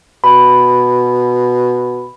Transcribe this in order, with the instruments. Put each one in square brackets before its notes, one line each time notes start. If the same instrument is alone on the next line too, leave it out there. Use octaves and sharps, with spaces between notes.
[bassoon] B2 [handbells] B5